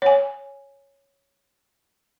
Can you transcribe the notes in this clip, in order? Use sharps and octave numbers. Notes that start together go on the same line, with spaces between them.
C#5 G#5